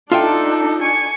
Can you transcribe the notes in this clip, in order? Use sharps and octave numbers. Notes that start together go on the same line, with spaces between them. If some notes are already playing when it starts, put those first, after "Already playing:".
D4 D#4 F4 A4 E5 G5
G#5 C#6